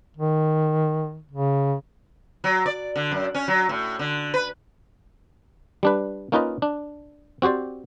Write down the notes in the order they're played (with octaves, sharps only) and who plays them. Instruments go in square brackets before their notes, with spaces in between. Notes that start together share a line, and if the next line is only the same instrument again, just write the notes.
[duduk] D#3
C#3
[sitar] F#3
D5
D3
F#2
C#4
F#3
A2
D3
B4
[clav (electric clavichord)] G3 D4 B4
A#3 C#4 D#4 F4 B4 D#5
D4
C4 F#4 G4 C5 D5